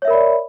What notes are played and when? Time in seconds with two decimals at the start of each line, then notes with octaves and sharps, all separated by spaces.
0.02 C#5
0.05 E5
0.08 A#4
0.10 B5
0.13 D5